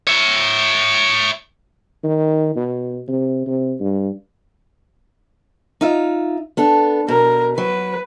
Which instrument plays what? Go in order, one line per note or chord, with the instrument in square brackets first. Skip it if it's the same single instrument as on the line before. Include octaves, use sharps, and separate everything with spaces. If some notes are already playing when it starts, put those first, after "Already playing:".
[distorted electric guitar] C#5 E5
[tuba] D#3
B2
C3
C3
G2
[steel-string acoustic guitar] D#4 F4 E5
B3 D4 A4
[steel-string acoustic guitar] B2 [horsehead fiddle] A#4
[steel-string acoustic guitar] F#3 [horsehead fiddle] B4